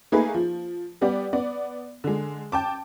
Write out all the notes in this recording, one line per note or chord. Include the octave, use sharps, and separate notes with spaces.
A3 A#3 D#4 G#4 B4
F3
G3 B3 G4 D5
B3 D5
D3 G#3
G5 A5 D6